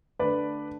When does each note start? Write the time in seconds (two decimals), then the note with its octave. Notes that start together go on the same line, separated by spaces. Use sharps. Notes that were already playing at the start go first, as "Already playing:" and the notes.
0.19 D3 A3 D4 B4 D5